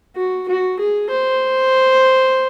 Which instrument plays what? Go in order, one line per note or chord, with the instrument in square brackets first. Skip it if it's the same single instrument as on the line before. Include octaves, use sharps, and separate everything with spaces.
[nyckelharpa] F#4
F#4
G#4
C5